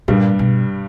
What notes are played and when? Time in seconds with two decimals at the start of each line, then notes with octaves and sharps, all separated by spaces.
0.08 G2 A#2 G3
0.39 B2